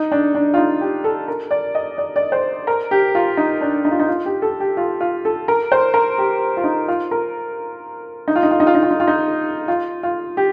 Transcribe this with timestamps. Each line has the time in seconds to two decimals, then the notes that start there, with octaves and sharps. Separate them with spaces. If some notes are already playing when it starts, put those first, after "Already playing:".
Already playing: D#4
0.12 D4
0.35 D4
0.54 F4
0.57 D#4
0.81 G4
1.04 A4
1.28 A#4
1.51 D5
1.75 D#5
1.98 D5
2.16 D5
2.32 C5
2.67 A#4
2.91 G4
3.15 F4
3.37 D#4
3.61 D4
3.85 D#4
3.91 F4
4.00 D#4
4.08 F4
4.26 G4
4.42 A4
4.60 G4
4.77 F4
5.01 F4
5.25 A4
5.48 A#4
5.72 C5
5.94 A#4
6.18 G4
6.57 F4
6.64 D#4
6.88 F4
7.11 A#4
8.28 D#4
8.36 F4
8.43 D#4
8.51 F4
8.60 D#4
8.67 F4
8.75 D#4
8.83 F4
8.91 D#4
9.00 F4
9.07 D#4
9.68 F4
10.03 F4
10.37 G4